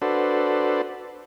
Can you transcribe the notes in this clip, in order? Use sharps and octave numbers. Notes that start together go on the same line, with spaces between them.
D4 F#4 A4 B4 C5